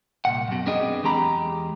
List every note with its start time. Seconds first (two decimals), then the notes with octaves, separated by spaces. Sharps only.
0.25 C2 F2 A#2 F#5
0.48 F#2 B2
0.66 F#2 B3 C4 D4 G#4 D#5
1.03 E2 G#3 G4 A#5 B5